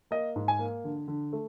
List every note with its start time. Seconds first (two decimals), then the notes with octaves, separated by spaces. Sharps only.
0.11 A#3 D#5
0.36 G#2
0.48 G#5
0.59 A#3
0.84 D3
1.08 D3
1.33 A3